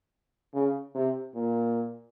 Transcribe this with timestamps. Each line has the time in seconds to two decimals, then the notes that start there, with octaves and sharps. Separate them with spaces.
0.54 C#3
0.95 C3
1.35 A#2